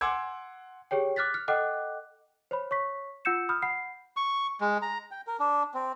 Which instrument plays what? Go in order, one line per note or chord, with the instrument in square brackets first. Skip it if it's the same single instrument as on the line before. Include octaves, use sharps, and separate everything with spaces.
[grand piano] F#5 G#5 C6 D6 E6 G#6
[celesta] G4 G#4 C#5 G5
D6 F6 F#6 A6 B6
F6
A4 D#5 F#5 G5 D6 F#6
C5 C#5 B5
C#5 C#6 B6
F4 F#5 E6 G6 C#7 E7
B5 D#6 F6 G6
F#5 B5 C7
[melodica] C#6
G#3
A#5
G5
A#4
D4
C4